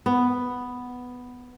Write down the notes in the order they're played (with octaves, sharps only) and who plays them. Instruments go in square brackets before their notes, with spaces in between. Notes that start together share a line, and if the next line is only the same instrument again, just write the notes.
[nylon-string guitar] B3